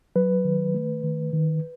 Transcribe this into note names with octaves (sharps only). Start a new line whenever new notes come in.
F#3 B4
D#3
A3
D#3
D#3